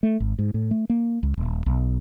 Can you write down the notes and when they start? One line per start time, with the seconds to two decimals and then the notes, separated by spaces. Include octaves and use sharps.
0.03 A3
0.20 G#1
0.39 G#2
0.54 A2
0.71 A3
0.90 A#3
1.23 C#2
1.37 D#1
1.66 B1